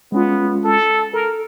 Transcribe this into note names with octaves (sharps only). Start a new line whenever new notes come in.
G#3 B3 C#4 F4
A4
A4 A#4